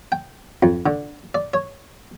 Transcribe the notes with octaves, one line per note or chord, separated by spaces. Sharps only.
G5
F2
D3
D5
C#5